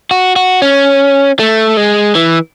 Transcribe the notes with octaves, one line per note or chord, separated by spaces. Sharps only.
F#4
F#4
C#4
A3
G#3
E3